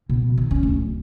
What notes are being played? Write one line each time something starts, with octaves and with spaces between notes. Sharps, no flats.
B2
D#3
C#4
D1